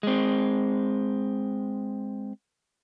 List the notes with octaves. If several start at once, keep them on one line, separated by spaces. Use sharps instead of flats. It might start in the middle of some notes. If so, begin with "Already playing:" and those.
G#3 C4